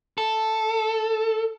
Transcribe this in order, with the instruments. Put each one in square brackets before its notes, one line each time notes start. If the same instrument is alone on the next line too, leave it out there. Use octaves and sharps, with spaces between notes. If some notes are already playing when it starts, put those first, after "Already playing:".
[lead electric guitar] A4